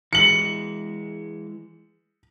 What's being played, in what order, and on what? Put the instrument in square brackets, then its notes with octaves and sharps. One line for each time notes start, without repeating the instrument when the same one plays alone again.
[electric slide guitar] E3 G#3 [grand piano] C#7 F#7